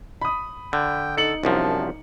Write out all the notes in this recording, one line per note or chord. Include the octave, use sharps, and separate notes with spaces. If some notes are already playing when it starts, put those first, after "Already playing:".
B5 D#6
D3 G5
D#4 A4 C#7 F#7
C2 F#2 F3 D4